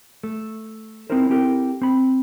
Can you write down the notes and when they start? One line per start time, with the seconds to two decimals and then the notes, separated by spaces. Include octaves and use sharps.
0.24 A3
1.10 C4 D#4 E4 A#4 C5
1.30 C4 E4 G4 A4 A#4
1.82 C4 B5